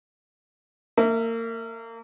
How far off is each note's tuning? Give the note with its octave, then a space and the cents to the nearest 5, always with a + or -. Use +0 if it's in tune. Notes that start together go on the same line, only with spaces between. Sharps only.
A#3 -30 E5 +0